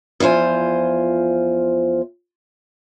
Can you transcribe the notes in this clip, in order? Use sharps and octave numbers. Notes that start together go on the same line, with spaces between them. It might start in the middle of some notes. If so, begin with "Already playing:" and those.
E2 F3 F4 C5 G#5